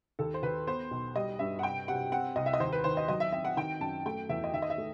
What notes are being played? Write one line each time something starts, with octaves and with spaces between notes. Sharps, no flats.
D#2 A4
C5
D#2 B4
B3 C5
B1
G3 D#5
G2 E5
F#5
C3 G5
C3 F#5
C4 F#5
C2 D#5
E5
D#5
D#2 C5
B4
D#3 C5
D#5
F#3 D#5
E5
C4 E5
F#5
D#3 G5
F#2 A5
A3 G5
E2 E5
D#5
D#3 E5
D#5
E5
A3